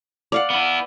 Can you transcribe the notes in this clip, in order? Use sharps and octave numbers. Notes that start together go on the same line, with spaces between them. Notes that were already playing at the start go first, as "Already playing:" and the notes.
D5 F5 F#5
B3 E4